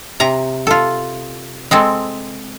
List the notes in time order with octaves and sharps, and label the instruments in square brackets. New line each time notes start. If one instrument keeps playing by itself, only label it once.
[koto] C3 A#5
F4 A4
G#3 C4 A4